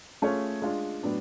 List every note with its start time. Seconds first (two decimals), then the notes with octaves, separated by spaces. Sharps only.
0.22 A3 C#4 F4 G#4 C#5
0.62 G#3 D4 F4
1.03 A2 F#3 B3 D4